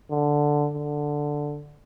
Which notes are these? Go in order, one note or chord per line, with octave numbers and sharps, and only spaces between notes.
D3
D3